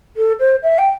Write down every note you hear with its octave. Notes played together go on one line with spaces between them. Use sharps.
A4
C5
E5
G5